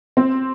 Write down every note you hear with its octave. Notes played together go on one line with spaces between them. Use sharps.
C4